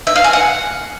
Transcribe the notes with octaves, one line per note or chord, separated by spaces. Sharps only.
E5
F5
G#5
F#5